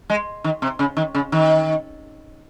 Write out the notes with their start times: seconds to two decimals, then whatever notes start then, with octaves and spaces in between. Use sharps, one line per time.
0.10 G#3
0.44 D#3
0.62 C3
0.79 C#3
0.97 D#3
1.15 C#3
1.32 D#3